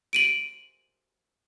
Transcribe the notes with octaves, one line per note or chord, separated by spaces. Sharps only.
D7 D#7 F#7